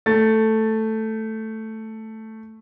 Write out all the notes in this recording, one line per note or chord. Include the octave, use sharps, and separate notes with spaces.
A3 A6